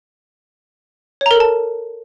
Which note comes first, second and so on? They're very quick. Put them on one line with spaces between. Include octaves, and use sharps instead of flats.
C#5 A#5 A#4 A4 A5